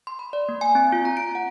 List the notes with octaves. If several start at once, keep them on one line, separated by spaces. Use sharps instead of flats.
C6
B5
D5
A#3
G#5
C4
F4
A#5
D7
F#5